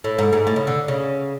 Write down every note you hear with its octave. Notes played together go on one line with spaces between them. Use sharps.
A2
G#2
G#2
A2
C#3
D3
C#3